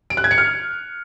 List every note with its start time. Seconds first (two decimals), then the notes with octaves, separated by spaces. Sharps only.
0.10 D7
0.17 F#6
0.24 G#6
0.31 C#7
0.38 F6